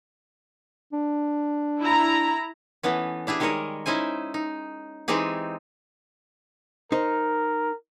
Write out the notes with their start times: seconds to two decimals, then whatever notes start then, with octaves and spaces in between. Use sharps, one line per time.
0.93 D4
1.81 E4 A#5
2.83 E3 A3 B3 C#4
3.27 D4 E4 G4 G#4
3.40 D#3 G3 G#3 A#4 C#5 D#5
3.86 C#4 D#4 E4 C5 G#5
4.34 D#4
5.08 E3 G#3 C4 D#4 G4 G#4
6.92 D#4 A#4 C5